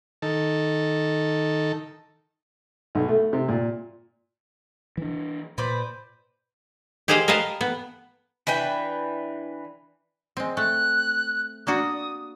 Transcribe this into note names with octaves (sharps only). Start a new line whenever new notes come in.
D#3 A4
B1
A3
C3
A#2
E3 D4
A#2 B4 C5 D5
G4 G#4 C5 D#5 F5 G5
A#4 B4 D#5 F5 A5
B3
E3 D4 B4 G5
G#3 C4
A3 F#6
A#3 D4 F#4 D#6